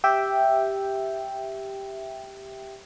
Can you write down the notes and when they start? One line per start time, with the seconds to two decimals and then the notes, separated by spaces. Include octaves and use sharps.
0.04 G4 E5 G5